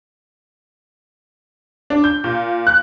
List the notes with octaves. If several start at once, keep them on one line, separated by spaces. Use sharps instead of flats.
D4
G6
A#2
F#6